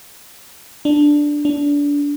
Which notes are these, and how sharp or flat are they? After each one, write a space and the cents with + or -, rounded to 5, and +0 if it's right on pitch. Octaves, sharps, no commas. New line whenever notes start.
D4 +0
D4 -25